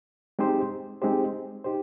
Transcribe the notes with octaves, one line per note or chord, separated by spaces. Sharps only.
G#3 C4 D#4 G4 C5
G#3 C4 D#4 G4 C5
D#4 G4 C5